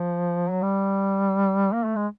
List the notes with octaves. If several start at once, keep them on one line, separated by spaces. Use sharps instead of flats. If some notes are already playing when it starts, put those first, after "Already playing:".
Already playing: F3
F#3
G3
A#3
A3
G#3